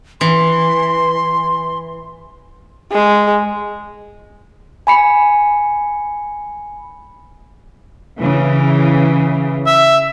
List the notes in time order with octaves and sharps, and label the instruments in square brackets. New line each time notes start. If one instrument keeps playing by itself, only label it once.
[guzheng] E3 [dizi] C6
[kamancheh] G#3
[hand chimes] G#5 B5 C#7
[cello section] C#3 E3
[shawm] E5